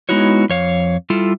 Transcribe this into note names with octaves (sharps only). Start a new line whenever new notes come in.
G#3 B3 D#4 E4 F#4 C#5
F2 C#5 F5
G3 E4 F4 A4